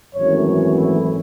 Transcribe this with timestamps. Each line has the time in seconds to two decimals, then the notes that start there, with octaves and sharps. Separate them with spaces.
0.15 G#1 F#2 E3 A3 C#5
0.44 C#5
0.73 E4